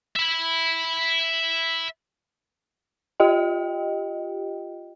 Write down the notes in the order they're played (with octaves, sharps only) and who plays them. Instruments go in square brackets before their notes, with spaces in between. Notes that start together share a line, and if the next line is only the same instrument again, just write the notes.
[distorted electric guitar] E5 B5
[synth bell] F4 G4 D#5 G5